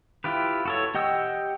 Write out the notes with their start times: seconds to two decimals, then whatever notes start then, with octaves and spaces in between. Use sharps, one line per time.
0.24 E4 F4 G4 B4
0.65 F#4 A4 C#5
0.95 G4 D#5 F#5 G5 E6